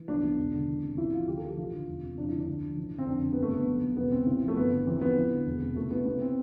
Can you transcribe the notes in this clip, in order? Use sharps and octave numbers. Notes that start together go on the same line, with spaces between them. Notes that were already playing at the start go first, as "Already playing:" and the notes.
Already playing: E3
B1 D4
B1
E1
D3
E1
C3
A1 E4
F3 F4
D2 G4
A4
F3
G4
A1 F4
D3
E1
C3
F1 D4
D3 E4
D4
D2
F3
A1
D3
C4
F1 D4
D3 C4
G1 B3
A3
D3 B3
B1
B1
E1 B3
C3 C4
A1
F3
A3
G1 B3
D3
E2 C4
F3 B3
A1
D3
E1
C3
C2 A3
C2 B3
C2 B3
C4